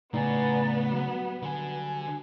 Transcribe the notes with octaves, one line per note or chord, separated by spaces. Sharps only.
A2 C#3 B3 D#4 D5 G#5 A#5
F#3 G3 F#5
D3 G#5